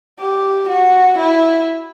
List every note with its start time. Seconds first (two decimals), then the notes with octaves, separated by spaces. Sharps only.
0.20 G4
0.69 F#4
1.19 E4